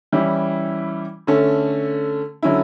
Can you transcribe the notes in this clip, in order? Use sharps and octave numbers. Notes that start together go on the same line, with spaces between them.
E3 G3 C#4 E4
D3 A3 C#4
D3 F#3 C#4 E4